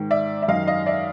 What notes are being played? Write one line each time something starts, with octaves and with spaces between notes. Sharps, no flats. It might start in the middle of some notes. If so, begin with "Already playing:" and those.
Already playing: G#2 D#3
D5 E5
E5
F#2 D#3 D#5 F5
D#5 F5
D5 E5